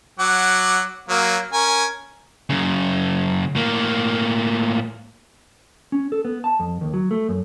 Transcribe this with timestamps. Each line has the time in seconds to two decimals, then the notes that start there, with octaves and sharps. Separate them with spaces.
0.19 F#3 F#5 D6
1.09 F#3 A#3
1.53 C#4 A#4 G#5
2.50 F#2 C#3
3.55 A2 A#3
5.92 C#4
6.12 A4
6.25 B3
6.44 A5
6.60 F2
6.81 D#2
6.94 F#3
7.11 A3
7.29 F#2